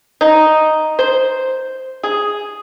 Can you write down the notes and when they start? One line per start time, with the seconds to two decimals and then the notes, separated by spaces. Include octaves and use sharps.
0.21 D#4
0.99 C5
2.03 G#4